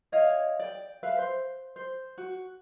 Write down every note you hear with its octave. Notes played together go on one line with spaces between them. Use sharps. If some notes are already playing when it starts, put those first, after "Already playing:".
E4 C#5 D#5 F5
D5 G5
B4 E5 F5
C5
C5
F#4